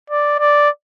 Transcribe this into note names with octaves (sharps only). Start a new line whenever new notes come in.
D5
D5